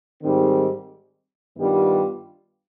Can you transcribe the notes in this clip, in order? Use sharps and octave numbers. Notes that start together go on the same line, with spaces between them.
G#2 D#3 G3 C4
G2 D#3 G3 B3 F4